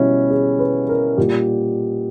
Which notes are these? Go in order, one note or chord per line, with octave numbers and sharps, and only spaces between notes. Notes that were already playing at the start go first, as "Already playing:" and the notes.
Already playing: B2 G3 C#4 E4
G#4
B4
A#4
A#2 G3 G4